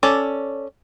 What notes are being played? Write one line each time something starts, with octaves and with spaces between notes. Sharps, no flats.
C#4 A4 D5